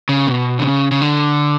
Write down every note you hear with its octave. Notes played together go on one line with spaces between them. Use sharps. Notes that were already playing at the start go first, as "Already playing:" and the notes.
C#3
B2
D3
C#3
C#3
D3